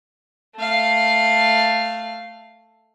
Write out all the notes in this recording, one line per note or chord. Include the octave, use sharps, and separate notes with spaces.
A3 F5